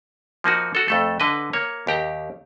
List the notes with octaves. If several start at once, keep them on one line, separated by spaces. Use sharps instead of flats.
F3 A#3 D#4 F#4
F#4 A4
F2 A3 A4
D3 B4 D#5
A#3 C#5
D#2 G4 A#5